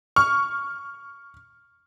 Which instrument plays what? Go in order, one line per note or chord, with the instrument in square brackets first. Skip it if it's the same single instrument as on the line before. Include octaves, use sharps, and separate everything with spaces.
[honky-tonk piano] C#6 F6